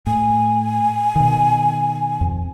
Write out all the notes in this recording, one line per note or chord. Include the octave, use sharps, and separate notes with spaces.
A2 G#5
B2 D#3
F2